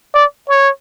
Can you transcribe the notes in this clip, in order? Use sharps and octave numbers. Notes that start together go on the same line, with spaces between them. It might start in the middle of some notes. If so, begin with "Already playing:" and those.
D5
C#5